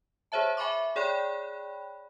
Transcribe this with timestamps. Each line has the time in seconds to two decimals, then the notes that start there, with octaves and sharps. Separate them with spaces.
0.32 G#4 C5 C#5 E5 A5
0.57 E5 G#5 B5 C#6 D6
0.96 G#4 C#5 D5 G5 B5 F#6